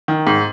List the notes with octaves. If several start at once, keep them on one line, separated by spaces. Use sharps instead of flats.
D#3
G#2